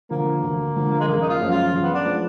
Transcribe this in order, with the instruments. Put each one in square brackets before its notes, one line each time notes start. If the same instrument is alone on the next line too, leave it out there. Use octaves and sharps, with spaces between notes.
[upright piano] D3 F3 [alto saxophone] A#3
[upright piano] D2
D3 F3
[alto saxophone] G#3
[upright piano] F#1 [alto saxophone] A#3
[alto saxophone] D#4
F4
[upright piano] F#2 F3
[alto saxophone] F4
[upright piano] F#1
[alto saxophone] B3
D4
[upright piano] F3